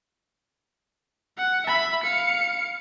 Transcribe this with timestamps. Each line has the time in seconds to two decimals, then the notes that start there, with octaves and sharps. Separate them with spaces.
1.38 F#5
1.67 E5 B5
2.04 F5 C#7